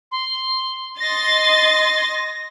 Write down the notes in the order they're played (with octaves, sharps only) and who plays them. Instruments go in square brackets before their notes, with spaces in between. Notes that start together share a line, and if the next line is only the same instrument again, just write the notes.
[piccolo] C6
[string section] D#5 C6 A6 [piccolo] A#6